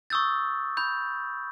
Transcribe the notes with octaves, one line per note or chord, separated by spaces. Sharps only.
C#6 D#6 E6 G6 A6
B5 G6